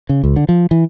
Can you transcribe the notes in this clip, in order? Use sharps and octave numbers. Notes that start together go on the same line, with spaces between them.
C#3
C#2
D3
F3
E3